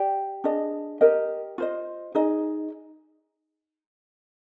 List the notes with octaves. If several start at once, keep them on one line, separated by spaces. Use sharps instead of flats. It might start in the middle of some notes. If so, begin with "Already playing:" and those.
Already playing: G4 D5 G5
D4 G#4 D#5
G4 A#4 D#5
F4 C5 D#5
D#4 G#4 D#5